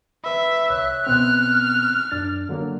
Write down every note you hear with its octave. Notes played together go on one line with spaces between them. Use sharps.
B4 E5 B5
C2 C#5 F#6
B2 B3 C4 F6
F#2 D4 A6
D3 F#3 A#3